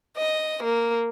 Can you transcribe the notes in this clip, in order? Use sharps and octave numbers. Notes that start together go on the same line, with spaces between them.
D#5
A#3